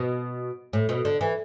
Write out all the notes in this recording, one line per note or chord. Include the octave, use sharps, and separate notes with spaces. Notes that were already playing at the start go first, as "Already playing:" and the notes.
Already playing: B2
A2
B2
D3
E3